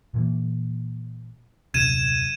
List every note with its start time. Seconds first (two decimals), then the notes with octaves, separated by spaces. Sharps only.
0.14 A#2 E3 A#3
1.74 D#1 F#2 C3 G#6 D#7 E7